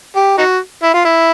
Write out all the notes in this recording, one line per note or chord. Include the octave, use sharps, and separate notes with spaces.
G4
D#4 F#4
E4
F4
E4